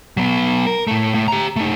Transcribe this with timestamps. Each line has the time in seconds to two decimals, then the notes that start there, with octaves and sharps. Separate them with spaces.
0.17 F#3 B3
0.67 A#4
0.87 A2 A3
1.14 A2
1.28 G4 A#5
1.56 A3 D#4